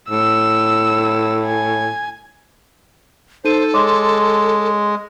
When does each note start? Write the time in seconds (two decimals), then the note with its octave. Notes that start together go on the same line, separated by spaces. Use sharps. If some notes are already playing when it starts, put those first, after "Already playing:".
0.10 A2 E6
1.47 G#5
3.45 D#4 A4 C5 D#7
3.74 G#3 C#5 C6 D6